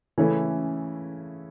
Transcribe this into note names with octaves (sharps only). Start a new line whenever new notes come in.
C#3 E3 A3 C#4 E4